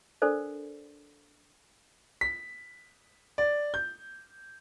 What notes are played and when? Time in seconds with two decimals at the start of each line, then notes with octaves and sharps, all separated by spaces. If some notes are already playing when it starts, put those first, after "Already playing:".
0.22 D4 A4 A#4 C5 D5
2.21 B6
3.38 D5
3.74 G6